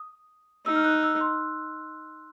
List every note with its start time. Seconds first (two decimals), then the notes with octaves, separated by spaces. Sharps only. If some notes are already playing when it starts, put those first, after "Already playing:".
Already playing: D#6
0.66 D#4 E6
0.75 F6
0.84 F#6
1.03 E6
1.21 C6